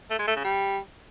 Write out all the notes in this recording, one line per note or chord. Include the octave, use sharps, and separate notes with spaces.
A3
G#3
A3
C#3
G3